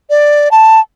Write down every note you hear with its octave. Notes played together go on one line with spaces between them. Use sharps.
D5
A5